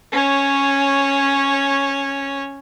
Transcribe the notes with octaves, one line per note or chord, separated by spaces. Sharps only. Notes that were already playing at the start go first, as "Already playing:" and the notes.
C#4 C#5